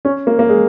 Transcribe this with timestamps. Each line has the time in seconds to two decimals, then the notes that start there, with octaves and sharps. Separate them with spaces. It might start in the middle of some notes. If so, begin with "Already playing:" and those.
0.05 C#4
0.27 A#3
0.39 A#3
0.49 G#3